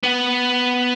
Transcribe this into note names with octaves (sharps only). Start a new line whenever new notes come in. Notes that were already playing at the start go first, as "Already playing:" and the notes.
B3